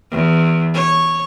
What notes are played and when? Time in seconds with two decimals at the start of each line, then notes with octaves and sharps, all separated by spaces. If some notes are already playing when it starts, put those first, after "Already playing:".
0.12 E2
0.74 C#5